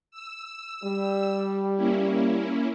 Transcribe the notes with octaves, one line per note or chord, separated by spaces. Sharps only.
E6
G3
A#3 C#4 E4